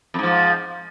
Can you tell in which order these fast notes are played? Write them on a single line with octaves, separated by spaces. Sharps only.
F2 G#2 F3